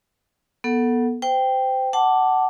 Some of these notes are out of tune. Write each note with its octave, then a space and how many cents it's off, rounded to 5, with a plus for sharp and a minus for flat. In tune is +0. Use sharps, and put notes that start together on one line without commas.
B3 -25 A4 +10 F#5 +0
C5 -25 G5 +0
F#5 +20 A5 +0 D6 +0